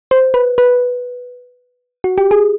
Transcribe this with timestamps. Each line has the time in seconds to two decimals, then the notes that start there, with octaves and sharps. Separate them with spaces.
0.11 C5
0.34 B4
0.58 B4
2.04 F#4
2.18 G4
2.31 G#4